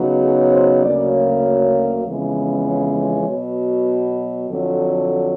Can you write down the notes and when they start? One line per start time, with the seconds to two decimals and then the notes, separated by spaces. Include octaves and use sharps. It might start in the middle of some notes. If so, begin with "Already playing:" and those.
Already playing: C#3 F#3 B3 D#4
0.22 G#4
0.52 C5
0.83 D2 C#3 F#3 A#3 C#4 D5
2.05 F2 C#3 E3 G#3 B3
2.66 C#5
3.27 B2 F#3 B3
4.49 F2 D3 F#3